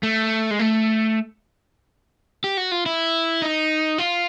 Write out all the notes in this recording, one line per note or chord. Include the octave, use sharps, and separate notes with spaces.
A3
G#3
A3
G4
F#4
F4
E4
D#4
F4